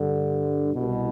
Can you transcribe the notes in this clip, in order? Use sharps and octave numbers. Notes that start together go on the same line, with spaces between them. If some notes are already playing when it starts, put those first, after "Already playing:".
Already playing: G2 D3
C2 B2